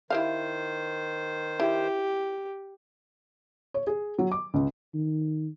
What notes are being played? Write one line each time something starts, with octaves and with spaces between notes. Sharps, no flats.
D#3 E4 G4 C5 F5
E4 G4
C#5
G#4
F#3
D6
C#2
D#3